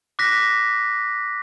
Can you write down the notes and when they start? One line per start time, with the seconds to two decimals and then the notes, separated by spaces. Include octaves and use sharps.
0.19 D6 F#6 A#6 B6